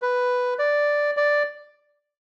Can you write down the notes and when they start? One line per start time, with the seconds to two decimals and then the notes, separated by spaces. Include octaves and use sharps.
0.02 B4
0.59 D5
1.17 D5